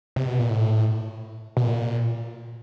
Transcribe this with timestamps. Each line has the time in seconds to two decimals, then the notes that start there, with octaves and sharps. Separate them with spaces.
0.16 C3
0.27 B2
0.39 A#2
0.50 A2
1.57 B2
1.63 A#2